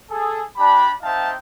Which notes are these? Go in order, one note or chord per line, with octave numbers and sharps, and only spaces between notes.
G#4 A4
D4 G4 B5
C4 D#4 E5 F5 G5 A5